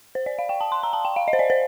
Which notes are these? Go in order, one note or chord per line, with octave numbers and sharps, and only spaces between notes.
C5
D5
F5
G5
A5
C6
A#5
A5
G5
F5
D#5
C5
D5
C5